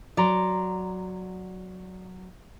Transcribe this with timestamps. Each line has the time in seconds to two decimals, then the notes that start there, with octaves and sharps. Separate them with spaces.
0.17 F#3 D5 A#5 C6